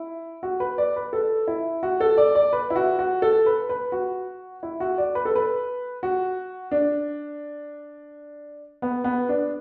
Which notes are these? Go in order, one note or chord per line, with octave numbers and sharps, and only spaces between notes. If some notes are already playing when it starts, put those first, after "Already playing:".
Already playing: E4
F#4
B4
D5
B4
A4
E4
F#4
A4
D5
D5
B4
E4
F#4
F#4
A4
B4
B4
F#4
E4
F#4
D5
B4
A4
B4
F#4
D4
B3
B3
D4